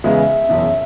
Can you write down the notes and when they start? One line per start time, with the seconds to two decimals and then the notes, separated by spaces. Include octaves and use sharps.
0.04 E2 C#3 G#3 B3 E5
0.49 F#1 E2 B2